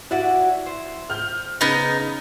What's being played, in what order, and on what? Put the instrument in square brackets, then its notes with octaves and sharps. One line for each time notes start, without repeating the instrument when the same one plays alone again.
[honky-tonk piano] E4 [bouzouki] F#4 D5 F#5
[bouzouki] C5
[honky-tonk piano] F6 G6
[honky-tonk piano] C#3 [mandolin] B3 D#4